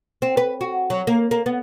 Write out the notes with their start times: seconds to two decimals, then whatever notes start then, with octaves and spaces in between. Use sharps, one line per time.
0.22 C4
0.37 B4
0.61 F#4
0.90 F#3
1.07 A#3
1.31 A#3
1.46 B3